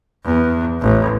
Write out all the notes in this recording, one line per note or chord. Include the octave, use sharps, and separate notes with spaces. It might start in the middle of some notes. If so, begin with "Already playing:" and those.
E2
A1